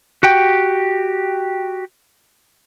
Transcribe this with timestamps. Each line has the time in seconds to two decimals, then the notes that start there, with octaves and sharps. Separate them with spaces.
0.23 F#4 G4 G5